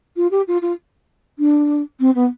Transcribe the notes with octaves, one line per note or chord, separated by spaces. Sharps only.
F4
G4
F4
F4
D4
C4
B3